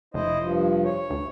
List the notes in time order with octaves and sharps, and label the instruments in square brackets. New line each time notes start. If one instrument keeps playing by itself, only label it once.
[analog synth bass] F1 [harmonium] E4 C5 D#5
[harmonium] G2 F3
C#5
[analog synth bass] D2